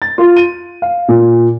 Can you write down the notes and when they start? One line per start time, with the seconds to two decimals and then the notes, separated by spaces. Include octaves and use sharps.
0.02 A6
0.18 F4
0.36 D#7
0.82 F5
1.08 A#2